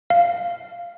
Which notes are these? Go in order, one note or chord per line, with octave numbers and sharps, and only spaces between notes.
F5